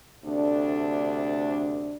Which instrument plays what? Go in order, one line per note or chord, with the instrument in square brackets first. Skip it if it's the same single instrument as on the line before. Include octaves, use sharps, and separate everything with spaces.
[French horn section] D2 C3 A3 D4